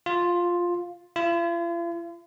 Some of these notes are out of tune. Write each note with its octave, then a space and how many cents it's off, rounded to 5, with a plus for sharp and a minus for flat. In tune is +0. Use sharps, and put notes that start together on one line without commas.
F4 +5
F4 -45